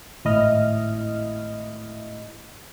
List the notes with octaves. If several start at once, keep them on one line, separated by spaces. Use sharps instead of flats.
G#1 A2 E4 D#5 F6